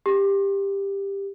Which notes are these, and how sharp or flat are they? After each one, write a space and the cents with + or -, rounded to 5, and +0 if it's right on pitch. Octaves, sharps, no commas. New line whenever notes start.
G4 +15